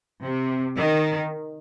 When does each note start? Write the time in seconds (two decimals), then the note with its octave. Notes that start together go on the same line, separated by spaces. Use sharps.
0.22 C3
0.78 D#3